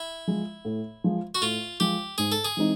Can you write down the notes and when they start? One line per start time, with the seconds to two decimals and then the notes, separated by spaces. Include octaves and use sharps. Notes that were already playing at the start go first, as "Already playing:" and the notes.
Already playing: E4
0.27 F3 G#3
0.65 A2
1.04 F3 G#3
1.35 F#4
1.41 A2 F4
1.80 F3 G#3 G4
2.18 G#2 G#4
2.32 A4
2.45 G#4
2.57 E3 G#3 C4 D#4